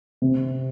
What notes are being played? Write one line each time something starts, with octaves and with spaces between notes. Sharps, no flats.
C3